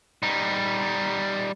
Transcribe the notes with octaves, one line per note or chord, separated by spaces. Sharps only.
G3 D#4